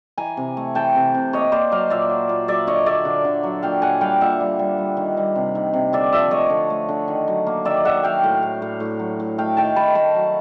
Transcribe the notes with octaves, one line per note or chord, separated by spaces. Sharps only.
E3 G#5 A#5
C3
A3
E3 G5 A5
C3
C3
A#3 C#5 D#5
A#3 C5 D5
F#3 D#5 F5
A#2 D5 E5
F#3
A#2
F#3 D5 E5
D3 C#5 D#5
A#3 D5 E5
D3
D3
F#3
A#2 F5 G5
A#2 F#5 G#5
G3 F5 G5
A#2 E5 F#5
G3
G3
G3
D#3
G3
C3
D#3
C3
D3 D5 E5
F3 D5 E5
A3 C#5 D#5
D3
A3
D3
D#3
F#3
A#3
D#3 D5 E5
D#3 E5 F#5
F#3 F5 G5
A2
A2
A2
A2
F#3
A2
A3 F5 G5
D#3 G5 A5
D#3 A5 B5
A3 A5 B5
F#3